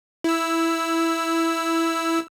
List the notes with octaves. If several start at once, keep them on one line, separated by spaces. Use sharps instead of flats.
E4 E6